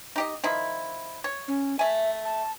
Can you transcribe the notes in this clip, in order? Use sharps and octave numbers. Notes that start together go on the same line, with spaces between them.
D#4 G4 D#5
D#3 F3 E4
C#5
C#4
A3 E5 G#5
A5